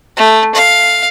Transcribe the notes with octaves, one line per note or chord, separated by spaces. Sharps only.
A3
F5